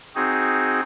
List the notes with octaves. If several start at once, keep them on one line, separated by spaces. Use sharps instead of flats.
C4 D#4 F#4 G#4